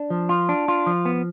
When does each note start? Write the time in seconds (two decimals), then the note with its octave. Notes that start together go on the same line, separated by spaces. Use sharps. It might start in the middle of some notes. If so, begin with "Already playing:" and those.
Already playing: D4
0.10 F3
0.29 F4
0.49 D4
0.68 F4
0.87 F3
1.05 B3